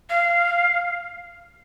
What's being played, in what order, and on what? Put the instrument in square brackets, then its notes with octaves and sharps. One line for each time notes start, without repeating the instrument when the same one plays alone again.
[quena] F5